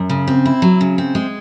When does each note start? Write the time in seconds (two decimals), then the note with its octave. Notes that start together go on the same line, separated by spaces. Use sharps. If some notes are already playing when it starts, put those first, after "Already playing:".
Already playing: F#2
0.10 C#3
0.27 C4
0.45 E4
0.62 F#3
0.81 C#3
0.98 C4
1.15 G#3